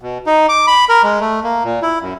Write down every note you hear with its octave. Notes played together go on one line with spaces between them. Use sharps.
B2
D#4
D6
B5
A#4
G#3
A3
A#3
A#2
E4
F#2